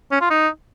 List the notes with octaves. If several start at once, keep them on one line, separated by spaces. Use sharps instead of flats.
C#4
F4
D#4